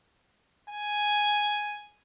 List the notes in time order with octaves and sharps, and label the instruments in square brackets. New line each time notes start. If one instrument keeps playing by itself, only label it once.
[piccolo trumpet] G#5